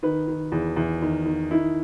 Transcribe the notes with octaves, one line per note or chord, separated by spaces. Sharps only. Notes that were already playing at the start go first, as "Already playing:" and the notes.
D#3 B4
D#3
E2
E2
D#3
D#3
D#3 E4